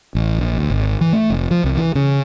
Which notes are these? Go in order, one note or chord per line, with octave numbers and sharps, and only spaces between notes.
A1
A#1
D2
G#1
E3
A3
F1
F3
C2
E3
C#3